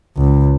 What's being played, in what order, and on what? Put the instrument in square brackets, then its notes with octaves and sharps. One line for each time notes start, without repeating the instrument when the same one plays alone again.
[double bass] C#2